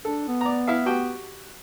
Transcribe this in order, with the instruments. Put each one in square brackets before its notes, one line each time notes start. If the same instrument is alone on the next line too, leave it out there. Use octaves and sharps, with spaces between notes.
[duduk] D4 [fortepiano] A4
[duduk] B3
[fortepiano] D5 A#5
E4 E5 F5
F#4 G4 G5